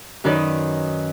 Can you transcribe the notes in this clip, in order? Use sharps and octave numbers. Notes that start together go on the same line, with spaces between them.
F#2 D#3 D#4 B4 D5